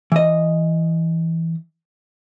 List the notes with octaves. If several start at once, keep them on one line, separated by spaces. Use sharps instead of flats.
E3 D#5